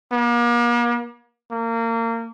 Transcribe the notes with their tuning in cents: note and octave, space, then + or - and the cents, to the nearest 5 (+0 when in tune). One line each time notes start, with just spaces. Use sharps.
A#3 +40
A#3 -25